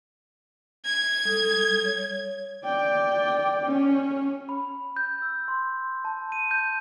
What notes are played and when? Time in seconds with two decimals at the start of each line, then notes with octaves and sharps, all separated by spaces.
0.85 G#6
1.25 G3 A4 D#6
1.85 C#5
2.65 D5 G5
3.64 C#4
4.49 B5
4.96 G6
5.22 E6
5.48 C6
6.05 A5
6.32 D#7
6.51 G6